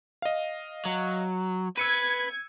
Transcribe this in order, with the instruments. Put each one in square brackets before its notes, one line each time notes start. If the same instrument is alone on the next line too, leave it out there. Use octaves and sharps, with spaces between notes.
[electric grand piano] D#5 F5
[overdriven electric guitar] F#3
[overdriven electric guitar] B4 [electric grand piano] E6 C#7 D#7 [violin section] G#6